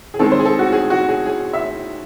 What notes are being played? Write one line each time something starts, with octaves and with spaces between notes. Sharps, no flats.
G#4
D#3 G#3 C4 A4
C5
G#4
A4
F#4
G#4
F#4
G#4
G#4
E5